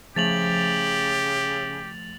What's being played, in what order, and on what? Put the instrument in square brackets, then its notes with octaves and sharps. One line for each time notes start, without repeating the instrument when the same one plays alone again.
[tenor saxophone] C#3 [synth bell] F3 A3 [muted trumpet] G4 [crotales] A6 F7 F#7